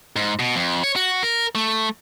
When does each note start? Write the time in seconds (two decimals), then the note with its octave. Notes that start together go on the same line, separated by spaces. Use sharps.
0.16 G#2
0.39 B2
0.56 F2
0.83 C#5
0.96 F#4
1.23 A#4
1.55 A3